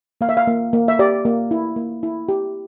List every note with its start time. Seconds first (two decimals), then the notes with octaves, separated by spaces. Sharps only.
0.21 A#3 F5
0.29 E5
0.37 F5
0.47 A#3
0.73 A#3
0.88 E5
0.99 G4 D5
1.25 A#3
1.51 E4
1.76 A#3
2.03 E4
2.29 G4